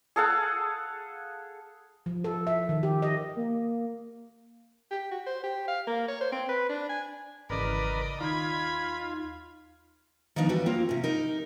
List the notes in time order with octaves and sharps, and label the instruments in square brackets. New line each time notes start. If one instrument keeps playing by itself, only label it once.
[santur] G#4 A4 F5 F#5
[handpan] F3
A4
E5
D#3
G4
D#5
[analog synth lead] A#3
[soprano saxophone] G4
F#4
C5
G4
F5
A#3
C#5
C5
C4
B4
D4
G#5
[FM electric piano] G#1 C#3 E3 [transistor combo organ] A#4 B4 [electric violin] D5 D#5
[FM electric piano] D#2 D#4 [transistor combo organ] F4 [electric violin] B5 G#6
[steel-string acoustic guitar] D#3 F3 B3 D4 D#4 C#5
E3 G3 F#4 G4 B4 C#5
A#3 C4 F4 A#4 C5
C3 C#4
D#4 G4 A#4